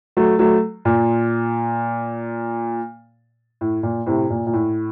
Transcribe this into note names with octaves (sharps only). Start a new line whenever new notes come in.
F#3 A3
F#3 A3
A#2
A2
A#2
A2 C3
A#2
A#2
A2